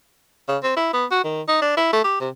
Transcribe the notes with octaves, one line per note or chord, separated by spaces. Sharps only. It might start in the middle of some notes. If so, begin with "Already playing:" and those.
C#3
C4
E4
B3
F#4
D#3
D#4
D4
E4
A3
G4
C3